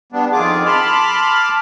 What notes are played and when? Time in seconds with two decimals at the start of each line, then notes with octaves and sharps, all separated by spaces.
0.12 G3 B3 D4
0.32 F2 D#3 F4 G#4 D6
0.66 A5 B5 C6 D6 F6